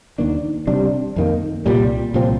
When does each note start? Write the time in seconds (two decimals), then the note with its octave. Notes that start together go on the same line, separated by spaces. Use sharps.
0.18 D#2 D#3 A#3 D4
0.67 C3 G3 D4
1.16 F2 D#3 A#3
1.66 C2 A#2 G3
2.14 C2 A#2 F3 C4